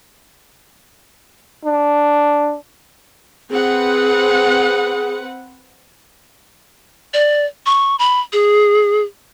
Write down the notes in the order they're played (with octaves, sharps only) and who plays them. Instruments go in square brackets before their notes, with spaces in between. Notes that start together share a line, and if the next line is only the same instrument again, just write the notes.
[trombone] D4
[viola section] C4 B4 F#5 [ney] G#4
[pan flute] D5
C#6
B5
G#4